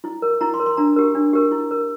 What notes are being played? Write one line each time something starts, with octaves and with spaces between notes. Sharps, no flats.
E4
A#4
E4 A#5
C6
A#4
C6
D4 A#5
G4 A#4
D4
G4 A#4
E4
A#4